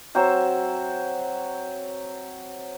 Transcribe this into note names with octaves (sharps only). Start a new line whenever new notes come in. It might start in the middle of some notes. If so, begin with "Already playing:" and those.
F#3 C4 C5 E5